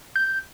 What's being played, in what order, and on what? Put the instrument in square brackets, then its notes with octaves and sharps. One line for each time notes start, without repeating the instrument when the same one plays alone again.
[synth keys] G6